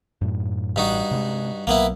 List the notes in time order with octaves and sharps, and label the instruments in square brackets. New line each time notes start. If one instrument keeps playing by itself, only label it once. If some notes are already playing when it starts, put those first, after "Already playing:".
[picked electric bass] F#2 A2
[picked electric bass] A1 [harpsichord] G2 D#4 F#4
[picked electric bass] C3 G3 G#3
[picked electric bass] B1 F#3 [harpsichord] A#3 B3 E4